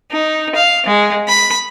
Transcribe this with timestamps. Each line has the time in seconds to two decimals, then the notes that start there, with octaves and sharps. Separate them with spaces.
0.11 D#4
0.55 F5
0.86 G#3
1.28 B5